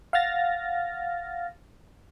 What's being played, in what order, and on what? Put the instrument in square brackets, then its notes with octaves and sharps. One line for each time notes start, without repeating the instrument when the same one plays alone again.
[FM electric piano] F5 F#5 F6 A6 A#6